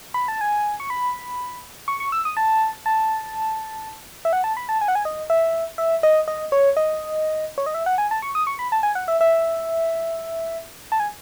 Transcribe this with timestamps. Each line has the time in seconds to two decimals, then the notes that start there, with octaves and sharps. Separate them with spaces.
0.14 B5
0.28 A5
0.41 G#5
0.80 C#6
0.90 B5
1.88 C#6
2.00 C#6
2.12 E6
2.25 D#6
2.37 A5
2.86 A5
4.25 E5
4.33 F#5
4.44 A5
4.57 B5
4.69 A5
4.81 G#5
4.88 F#5
4.95 G#5
5.05 D#5
5.30 E5
5.78 E5
6.03 D#5
6.28 D#5
6.52 C#5
6.77 D#5
7.58 C#5
7.66 D#5
7.74 E5
7.86 F#5
7.98 G#5
8.11 A5
8.22 C#6
8.35 D#6
8.47 C#6
8.59 B5
8.72 A5
8.83 G#5
8.95 F#5
9.08 E5
9.21 E5
10.92 A5
11.00 G#5